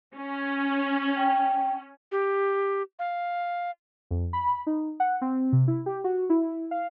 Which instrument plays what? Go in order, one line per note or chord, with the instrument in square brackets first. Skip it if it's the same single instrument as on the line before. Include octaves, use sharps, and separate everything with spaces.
[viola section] C#4
[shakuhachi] G5
[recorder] G4
F5
[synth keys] F2
B5
D#4
F#5
C4
C3
E4
G4
F#4
E4
F5